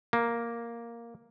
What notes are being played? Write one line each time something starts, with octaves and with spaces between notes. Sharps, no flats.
A#3